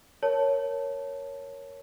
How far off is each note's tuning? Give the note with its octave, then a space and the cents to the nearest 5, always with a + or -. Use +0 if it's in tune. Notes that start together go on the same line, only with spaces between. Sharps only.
A#4 +0 C#5 +0 A5 +0